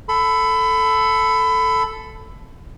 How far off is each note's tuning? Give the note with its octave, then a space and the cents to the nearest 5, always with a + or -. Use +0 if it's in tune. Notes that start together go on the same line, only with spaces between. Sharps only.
A4 +0 B5 +25